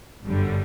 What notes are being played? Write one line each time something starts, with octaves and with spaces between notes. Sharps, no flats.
G1 F#2 D3 G3